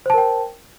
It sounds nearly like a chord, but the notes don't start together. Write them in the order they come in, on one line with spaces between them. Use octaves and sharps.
C5 A5 A#4 G5